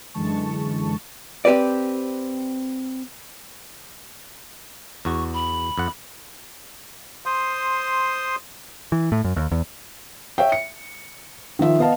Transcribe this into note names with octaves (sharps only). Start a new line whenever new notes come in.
F#2 D3 E3 G#3 A5 C#6
C4 G4 B4 D5
E2 F#4 C#6
B5
F2 F#5
C5 C6 D#6
E3
A2
F#2
D#2
E2
C#5 E5 G5
C#7
D#3 F3 E5
B3 B4 D#5 F5 A5